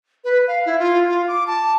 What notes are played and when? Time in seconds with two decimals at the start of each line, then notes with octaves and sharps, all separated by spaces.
0.24 B4
0.48 F5
0.66 E4
0.79 F4
1.09 F4
1.28 D6
1.47 A5